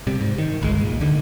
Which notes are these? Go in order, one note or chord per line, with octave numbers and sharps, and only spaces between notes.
C3 G3
G#2
D#3
G1 C2 G2 G#3
A#2
D#2 D3 D#3